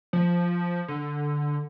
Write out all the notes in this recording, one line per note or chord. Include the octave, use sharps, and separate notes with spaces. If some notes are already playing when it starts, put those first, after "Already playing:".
F3
D3